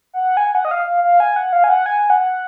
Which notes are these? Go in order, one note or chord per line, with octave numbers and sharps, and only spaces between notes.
F#5
G#5
G#5
F#5
D#5
F5
F5
F5
G#5
F#5
F5
G#5
F#5
G#5
F#5